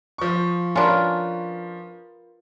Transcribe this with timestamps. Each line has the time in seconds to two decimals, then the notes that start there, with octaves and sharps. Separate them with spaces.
0.18 F3 C#6
0.76 C#4 D4 F4 A#4 B4